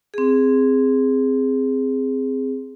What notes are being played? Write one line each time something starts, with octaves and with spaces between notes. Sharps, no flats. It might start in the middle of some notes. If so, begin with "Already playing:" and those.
C4 G#4